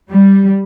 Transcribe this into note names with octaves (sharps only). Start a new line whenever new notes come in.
G3